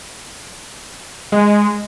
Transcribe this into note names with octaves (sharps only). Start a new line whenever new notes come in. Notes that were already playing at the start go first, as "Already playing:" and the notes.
G#3